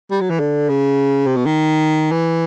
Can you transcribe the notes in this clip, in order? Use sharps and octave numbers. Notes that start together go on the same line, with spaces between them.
G3
F#3
E3
D3
C#3
C3
B2
D#3
E3